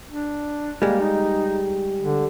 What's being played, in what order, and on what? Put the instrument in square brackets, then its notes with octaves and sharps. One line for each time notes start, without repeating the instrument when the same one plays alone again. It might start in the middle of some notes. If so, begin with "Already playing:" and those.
[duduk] D4
[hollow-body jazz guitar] G3 G#3 [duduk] A#3
[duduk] D#4
D3